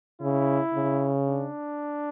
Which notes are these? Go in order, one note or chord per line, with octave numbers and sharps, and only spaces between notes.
C#3 E4
C#3
D4